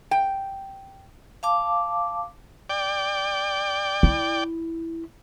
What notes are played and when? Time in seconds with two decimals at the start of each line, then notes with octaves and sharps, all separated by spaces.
0.11 G5
1.43 F5 A5 D6
2.70 D5 G5
4.03 E4